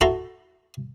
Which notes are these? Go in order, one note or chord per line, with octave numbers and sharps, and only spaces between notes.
E4 F#4 A4 A#5 C6